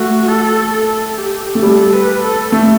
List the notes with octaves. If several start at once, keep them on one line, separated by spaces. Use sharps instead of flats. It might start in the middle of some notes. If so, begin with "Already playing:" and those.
Already playing: A3 F#4
A4
A4
G4
A3
G3 A4
B4
A4
A3